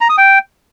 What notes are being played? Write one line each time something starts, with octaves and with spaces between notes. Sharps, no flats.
A#5
D#6
G5